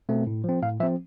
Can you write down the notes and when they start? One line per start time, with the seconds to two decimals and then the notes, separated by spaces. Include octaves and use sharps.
0.09 B2 A3 C4
0.27 A2
0.44 F3 C4
0.62 A2 F5
0.80 F3 E5
0.83 C4